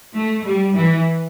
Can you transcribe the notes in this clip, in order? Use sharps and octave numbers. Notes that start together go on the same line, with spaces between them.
A3
G3
E3